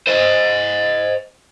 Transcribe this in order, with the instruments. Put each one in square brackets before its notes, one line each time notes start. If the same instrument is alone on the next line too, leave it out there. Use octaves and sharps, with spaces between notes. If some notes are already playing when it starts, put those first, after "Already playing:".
[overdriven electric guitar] C5 D#5